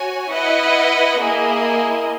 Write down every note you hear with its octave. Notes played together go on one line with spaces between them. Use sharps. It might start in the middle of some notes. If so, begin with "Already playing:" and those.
Already playing: F#4 C#5 G#5
E4 B4 D#5 F#5
A#3 E4 G#4 D#5